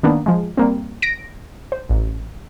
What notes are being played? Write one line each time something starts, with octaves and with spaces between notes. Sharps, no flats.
D#3 A#3 B3 D4
F3 G#3
G3 A#3 C4
A#6 D7
C5
A1